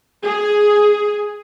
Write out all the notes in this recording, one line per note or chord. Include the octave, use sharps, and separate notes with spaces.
G#4